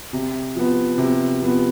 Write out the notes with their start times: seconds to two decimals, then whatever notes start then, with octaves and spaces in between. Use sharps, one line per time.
0.13 C3
0.55 F3 B3
0.98 C3
1.41 F3 B3